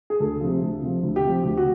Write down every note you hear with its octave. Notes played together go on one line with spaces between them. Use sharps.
G#4
D2 A4
C3 F3
D2
C3 F3
D2
G4
C3 F3
D2 G4
F#4